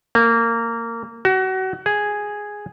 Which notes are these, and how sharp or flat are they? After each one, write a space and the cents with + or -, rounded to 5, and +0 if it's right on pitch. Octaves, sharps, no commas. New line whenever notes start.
A#3 -20
F#4 +30
G#4 -5